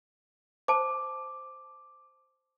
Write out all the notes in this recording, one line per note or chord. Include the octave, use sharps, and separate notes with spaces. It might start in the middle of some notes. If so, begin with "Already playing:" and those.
C5 A5 D6